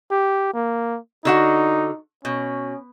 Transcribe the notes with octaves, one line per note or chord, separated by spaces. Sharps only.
G4
A#3
D3 D#4 F#4 F#5
B2 C#4